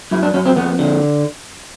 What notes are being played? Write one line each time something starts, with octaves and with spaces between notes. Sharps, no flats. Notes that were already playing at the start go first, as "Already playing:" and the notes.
F#2 E4
D4
F#2 C#4
C4
F2 B3
D3